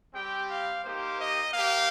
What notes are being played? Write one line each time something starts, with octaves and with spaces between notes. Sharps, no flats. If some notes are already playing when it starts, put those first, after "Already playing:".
G3 C4 G4 G5
F5
A#3 D#4 G4 C5
D#5
A#3 G4 F5